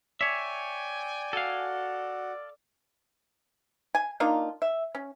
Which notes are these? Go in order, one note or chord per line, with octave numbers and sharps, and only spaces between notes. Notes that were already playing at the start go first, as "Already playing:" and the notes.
C#5 D5 E5 G5 G#5
F#4 A4 F5
G#5
A#3 D4 D#4 F4
E5
C#4